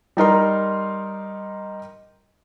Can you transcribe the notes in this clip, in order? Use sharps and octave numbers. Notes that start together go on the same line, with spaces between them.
G3 D#4 A#4 C6